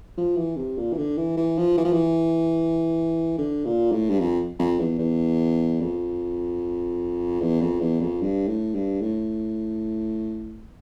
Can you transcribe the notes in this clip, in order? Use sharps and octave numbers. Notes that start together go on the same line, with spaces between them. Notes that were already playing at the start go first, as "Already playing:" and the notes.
F3
E3
C3
A#2
E3
D3
E3
E3
F3
E3
F3
E3
D3
A#2
A2
G2
F2
F2
E2
E2
F2
E2
F2
E2
F2
G2
A2
G2
A2